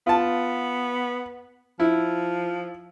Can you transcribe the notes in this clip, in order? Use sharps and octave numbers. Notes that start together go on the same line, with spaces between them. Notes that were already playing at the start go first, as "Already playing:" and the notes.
B3 F4 A5
F3 E4